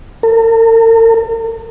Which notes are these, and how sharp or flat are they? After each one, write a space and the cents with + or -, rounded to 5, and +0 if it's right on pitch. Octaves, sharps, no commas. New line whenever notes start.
A#4 -45